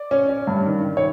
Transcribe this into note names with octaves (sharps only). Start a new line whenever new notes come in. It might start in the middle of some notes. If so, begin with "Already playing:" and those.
Already playing: D5
C#4
C#4
G2
D#3
D#3
C#5